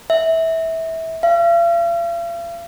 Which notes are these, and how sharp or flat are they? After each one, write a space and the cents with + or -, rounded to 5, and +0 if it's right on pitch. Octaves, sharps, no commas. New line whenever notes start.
E5 -20
F5 -45